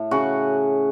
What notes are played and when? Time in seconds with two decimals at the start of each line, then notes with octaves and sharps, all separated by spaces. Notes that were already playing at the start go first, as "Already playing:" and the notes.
Already playing: A2 A3
0.11 C#3 F#4